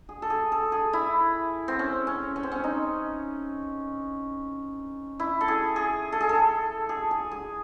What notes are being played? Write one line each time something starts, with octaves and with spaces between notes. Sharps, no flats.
G#4
A4
G#4
A4
G#4
E4
C4
C#4
C#4
C#4
C4
C#4
D#4
E4
A4
G#4
G#4
A4
G#4
A4
G#4
G#4
G#4